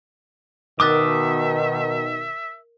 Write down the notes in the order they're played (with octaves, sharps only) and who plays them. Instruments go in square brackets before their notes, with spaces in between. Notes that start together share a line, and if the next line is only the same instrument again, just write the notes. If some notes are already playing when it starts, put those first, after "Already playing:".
[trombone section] B2 D#3 [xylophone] A#4 F#6 A6 [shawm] E5 [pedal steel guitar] D6 D#6